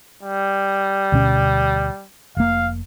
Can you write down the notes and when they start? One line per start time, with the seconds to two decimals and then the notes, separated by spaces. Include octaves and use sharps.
0.23 G3
1.12 D2 B2 C#4
2.37 F1 A#3 F5